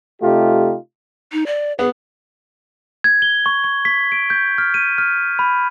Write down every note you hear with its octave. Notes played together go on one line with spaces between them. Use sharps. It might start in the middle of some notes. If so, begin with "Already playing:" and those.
C3 A3 D#4 F4 G4
D#4
D5
B3 G#4
G#6
G7
C#6
C#6
B6
D7
G6
F6
D#7
F6
B5